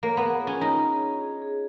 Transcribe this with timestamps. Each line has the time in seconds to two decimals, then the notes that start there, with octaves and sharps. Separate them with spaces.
0.03 A#3 C#5
0.17 B3
0.23 G#4
0.42 F4
0.47 C#4
0.61 D#4 C#5
0.82 C#5
1.02 C#5
1.21 G#4
1.42 G#4